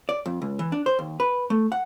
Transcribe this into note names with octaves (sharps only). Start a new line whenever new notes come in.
D5
F2
C#2
E3
D4
C5
D#2
B4
A3
F#5